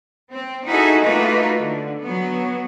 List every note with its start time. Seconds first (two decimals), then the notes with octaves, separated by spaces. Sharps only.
0.30 C4
0.66 D#4 E4 F#4 G#4 A4 D#5
1.01 A3 A#3 D#4 F4 F#4 B4
1.59 D3
2.02 F#3 B3